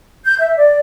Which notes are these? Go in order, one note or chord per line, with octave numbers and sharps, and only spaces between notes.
G6
E5
D5